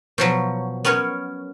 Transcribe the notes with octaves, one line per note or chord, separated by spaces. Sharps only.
B2 F3 F#3
B3 C#4 A#4 C#5